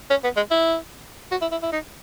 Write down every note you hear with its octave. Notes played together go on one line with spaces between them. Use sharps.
C#4
B3
G#3
E4
F#4
E4
E4
E4
D#4